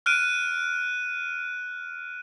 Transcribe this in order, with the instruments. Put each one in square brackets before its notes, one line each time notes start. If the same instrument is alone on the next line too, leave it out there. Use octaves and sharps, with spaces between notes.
[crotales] F6 F#6 D7 D#7